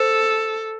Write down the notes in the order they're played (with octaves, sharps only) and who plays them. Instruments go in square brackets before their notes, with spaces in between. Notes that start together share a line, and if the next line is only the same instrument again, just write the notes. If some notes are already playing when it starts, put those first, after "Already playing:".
Already playing: [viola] A4 [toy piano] C5